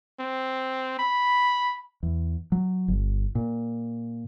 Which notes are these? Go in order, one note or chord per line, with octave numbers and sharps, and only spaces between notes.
C4
B5
E2
F#3
G1
A#2